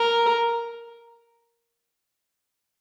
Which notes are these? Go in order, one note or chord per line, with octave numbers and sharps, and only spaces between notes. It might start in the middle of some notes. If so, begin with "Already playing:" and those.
Already playing: A#4